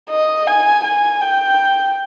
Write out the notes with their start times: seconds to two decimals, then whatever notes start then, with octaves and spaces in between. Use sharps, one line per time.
0.10 D#5
0.47 G#5
0.85 G#5
1.22 G5